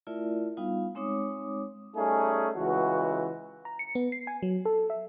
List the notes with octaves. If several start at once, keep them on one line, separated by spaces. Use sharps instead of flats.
A3 E4 F4 A#4 D5 E5
G3 B3 D#4 F4 F5
G#3 C4 D#4 C#5 D6 D#6
G3 A3 C#4 D#4 G#4
C#2 E3 F#4
A#5
C#7
B3
C7
G#5
F#3
A4
E5